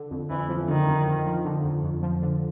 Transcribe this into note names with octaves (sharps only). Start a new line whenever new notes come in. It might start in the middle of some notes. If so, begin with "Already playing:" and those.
Already playing: D3
F2
F2 E3
F3
D3 D#3
F2
F2
F3
D3
F2
F2
F3
D3